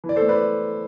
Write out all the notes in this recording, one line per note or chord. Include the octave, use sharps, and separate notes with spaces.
E3
D5
A4 C5
A3
B4 D5